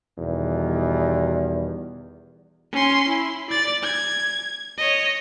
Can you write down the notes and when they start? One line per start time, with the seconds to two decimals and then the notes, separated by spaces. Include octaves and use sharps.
0.19 E2 B2 D#3 G3
2.72 C#4 C6
3.08 E4
3.50 D5 A6
3.83 G#6
4.77 C#5 D#5